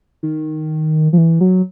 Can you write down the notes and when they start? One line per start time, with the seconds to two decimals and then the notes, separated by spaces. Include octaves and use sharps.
0.23 D#3
1.13 F3
1.18 E3
1.41 F#3